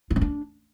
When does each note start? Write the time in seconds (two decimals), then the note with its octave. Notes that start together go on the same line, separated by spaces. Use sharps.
0.10 F4
0.16 C#4
0.21 D4